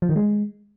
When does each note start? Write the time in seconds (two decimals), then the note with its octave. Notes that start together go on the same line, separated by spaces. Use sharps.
0.02 F3
0.09 D#3
0.16 G#3